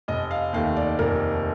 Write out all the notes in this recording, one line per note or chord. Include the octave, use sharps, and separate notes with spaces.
F1 D#5
F5
D#2 D#3 A3 F5
D5
F1 A#4